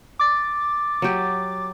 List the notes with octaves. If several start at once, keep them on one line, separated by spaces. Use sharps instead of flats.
D6 A6
F#3 G4